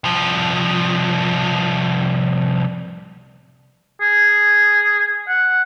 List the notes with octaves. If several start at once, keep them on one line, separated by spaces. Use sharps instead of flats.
C2 F3
G#4
F#5